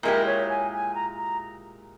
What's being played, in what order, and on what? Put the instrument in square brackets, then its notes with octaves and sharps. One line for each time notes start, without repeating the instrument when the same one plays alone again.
[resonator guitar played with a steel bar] A#2 G#3 E4 G4 [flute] A#4
[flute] C#5
G#5
G#5
A#5
A#5